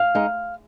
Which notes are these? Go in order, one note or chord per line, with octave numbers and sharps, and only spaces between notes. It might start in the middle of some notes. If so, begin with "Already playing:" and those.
Already playing: F5
G#3 D#4